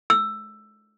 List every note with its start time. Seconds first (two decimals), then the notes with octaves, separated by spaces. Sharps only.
0.10 E6